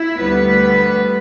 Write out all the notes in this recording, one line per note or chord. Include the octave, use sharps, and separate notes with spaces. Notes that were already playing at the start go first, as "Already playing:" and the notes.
Already playing: E4
D2 D3 G3 B3 B4